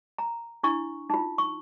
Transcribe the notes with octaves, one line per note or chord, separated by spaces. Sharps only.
A#5
D4 E4 C#6
D#4 F4
C#6